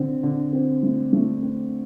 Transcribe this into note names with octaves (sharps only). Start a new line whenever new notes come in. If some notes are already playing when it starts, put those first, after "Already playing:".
Already playing: D3 C4
D3
C4
A3
A3
C4